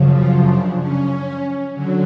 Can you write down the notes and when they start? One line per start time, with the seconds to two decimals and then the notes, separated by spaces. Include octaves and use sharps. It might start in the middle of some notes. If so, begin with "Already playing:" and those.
Already playing: F#2 C#3 F3
0.16 F4
0.48 D4
0.78 C#4
1.73 D3 F#3